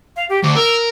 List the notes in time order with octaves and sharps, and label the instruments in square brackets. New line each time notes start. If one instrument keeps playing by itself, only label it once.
[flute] F5
G4
[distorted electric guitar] D2 [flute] D6
[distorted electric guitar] A#4 [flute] E6